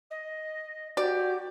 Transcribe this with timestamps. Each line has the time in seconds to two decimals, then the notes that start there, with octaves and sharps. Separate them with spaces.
0.10 D#5
0.97 F#4 G4 D5